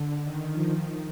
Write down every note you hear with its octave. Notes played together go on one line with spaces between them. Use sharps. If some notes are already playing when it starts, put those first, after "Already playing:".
Already playing: D3
D#3
F3
D#3